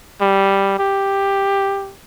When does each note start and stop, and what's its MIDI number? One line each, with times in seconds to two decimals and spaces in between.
0.21 0.74 55
0.79 1.93 67